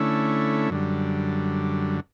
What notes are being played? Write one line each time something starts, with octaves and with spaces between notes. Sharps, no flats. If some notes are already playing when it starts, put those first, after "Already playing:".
Already playing: D3 A3 C#4 E4
F#2 D3 G3